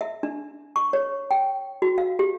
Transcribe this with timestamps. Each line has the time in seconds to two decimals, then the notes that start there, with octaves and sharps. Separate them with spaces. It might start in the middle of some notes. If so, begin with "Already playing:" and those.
0.01 E5
0.23 D4
0.76 C#6
0.93 C#5
1.31 G5
1.82 F#4
1.98 F5
2.19 G4